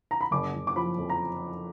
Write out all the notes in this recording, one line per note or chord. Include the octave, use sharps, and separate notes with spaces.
A#5
B5
F#1 D6
F#1
D6
F3 B5
F2
A#5